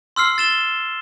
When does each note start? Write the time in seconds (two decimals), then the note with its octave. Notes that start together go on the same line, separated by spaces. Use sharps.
0.16 C6 E6 F6 C7
0.38 A6 E7 G7